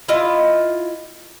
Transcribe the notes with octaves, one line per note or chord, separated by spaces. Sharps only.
E4 F4 D#5